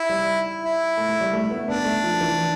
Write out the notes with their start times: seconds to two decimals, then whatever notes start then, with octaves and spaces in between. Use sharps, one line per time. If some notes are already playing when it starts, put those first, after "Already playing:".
Already playing: E4
0.09 G3
0.63 E4
0.97 A3
1.09 A3
1.21 G3
1.33 A3
1.44 A3
1.51 B3
1.68 B3 D4
1.85 A3
2.03 F3
2.21 E3